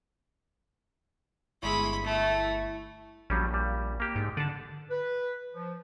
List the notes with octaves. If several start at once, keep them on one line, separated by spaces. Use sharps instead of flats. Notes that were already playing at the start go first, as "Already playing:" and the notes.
G1 G#3 E4 B5 C#6
A3
A#1 F#3 G3 C#4
G3
A#3 G4
G#2
D3 D5 A5
B4
F3